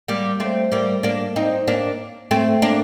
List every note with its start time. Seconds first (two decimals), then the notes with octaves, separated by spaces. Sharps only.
0.08 G3 A#3
0.40 A3 C4
0.72 G3 A#3
1.03 A#3 D4
1.36 C4 D#4
1.68 A#3 D4
2.31 A3 C4
2.62 A#3 D4